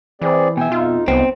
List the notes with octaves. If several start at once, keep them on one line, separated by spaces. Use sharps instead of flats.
E3 C4 G#4 D5
B2 E5 G5 G#5
F2 D#4 F4
C2 F#3 B3 C4